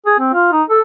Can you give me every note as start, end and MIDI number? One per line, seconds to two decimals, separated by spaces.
0.06 0.16 68
0.19 0.31 60
0.34 0.51 65
0.52 0.63 63
0.70 0.80 69